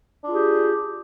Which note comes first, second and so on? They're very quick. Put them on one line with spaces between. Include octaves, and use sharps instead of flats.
D4 F4 G#4 G4